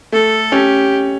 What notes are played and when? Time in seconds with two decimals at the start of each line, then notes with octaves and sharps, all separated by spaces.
0.12 A3 A4
0.52 C#4 G4